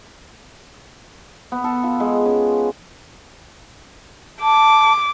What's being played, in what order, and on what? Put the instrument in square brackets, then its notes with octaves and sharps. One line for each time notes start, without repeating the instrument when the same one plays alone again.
[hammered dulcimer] B3
A4
F4
G#3
C#4
[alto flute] A5 [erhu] D6